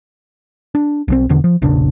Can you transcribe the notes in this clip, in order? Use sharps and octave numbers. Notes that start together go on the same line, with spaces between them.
D4
B1 E3 C4
E1 E2 D3
F3
E1 A#1 C#3 D4